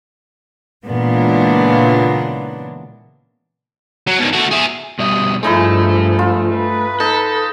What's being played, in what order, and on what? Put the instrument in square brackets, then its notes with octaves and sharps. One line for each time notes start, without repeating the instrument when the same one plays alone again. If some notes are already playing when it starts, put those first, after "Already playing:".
[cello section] A#2 C#3 E3 G#3 B3 D4
[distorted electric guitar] F#3
B2 D#3
A3 F#4
G#4 E5
[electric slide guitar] B2 G3 E5 [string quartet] D#6
[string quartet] G2 F3 [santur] G#3 D#4 E4 [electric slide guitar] A3
[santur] F4
[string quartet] B4
[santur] D#4 [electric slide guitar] A4